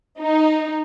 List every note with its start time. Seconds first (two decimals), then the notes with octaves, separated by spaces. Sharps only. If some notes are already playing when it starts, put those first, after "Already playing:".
0.20 D#4